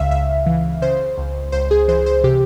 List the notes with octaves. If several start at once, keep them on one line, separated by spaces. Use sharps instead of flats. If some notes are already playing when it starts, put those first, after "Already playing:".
Already playing: C#2 C#3 E5 F5
C#2 E5
E3
C#3 C5
C#2
C#2 C5
G#4
E3 C5
C5
C3 G4